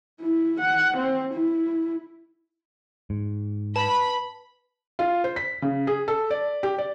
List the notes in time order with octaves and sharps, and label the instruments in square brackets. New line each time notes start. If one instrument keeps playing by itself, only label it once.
[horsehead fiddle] E4
F#5
C4
E4
[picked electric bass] G#2
[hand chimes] B4 [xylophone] A5 [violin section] B5
[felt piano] F4
C5
B6
C#3
G#4
A4
D5
G4
D5